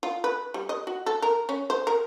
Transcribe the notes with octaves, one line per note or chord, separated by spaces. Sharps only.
F4
B4
G3
D#5
F#4
A4
A#4
C#4
C5
A#4